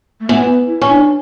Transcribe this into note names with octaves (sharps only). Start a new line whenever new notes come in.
A3
E3 B3
E4
C#4
D4